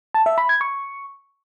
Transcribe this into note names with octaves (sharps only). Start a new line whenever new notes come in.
A5
E5
B5
G#6
C#6